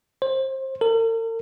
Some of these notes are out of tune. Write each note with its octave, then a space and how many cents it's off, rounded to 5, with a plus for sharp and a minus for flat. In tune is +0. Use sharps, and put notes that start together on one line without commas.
C5 +25
A#4 -45